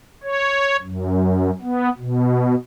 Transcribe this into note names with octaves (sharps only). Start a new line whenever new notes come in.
C#5
F#2
B3
B2